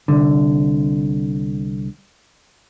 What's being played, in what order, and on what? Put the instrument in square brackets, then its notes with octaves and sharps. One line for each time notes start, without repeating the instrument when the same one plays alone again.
[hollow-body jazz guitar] C2 D3